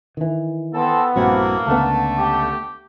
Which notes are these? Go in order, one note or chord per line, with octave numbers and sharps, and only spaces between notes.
D#3 E3
B3 C4 A4
A#1 G2 A3 A#3 C4 E4 F#4
C#2 D3 A3 B3 A5
G4